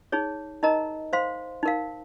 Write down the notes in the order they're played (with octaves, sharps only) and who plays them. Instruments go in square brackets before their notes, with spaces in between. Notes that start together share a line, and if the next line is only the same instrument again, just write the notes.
[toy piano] D#4 G#4 C#5
D#4 A#4 D#5 A#5
C5 F5 C6
D#4 A#4 F5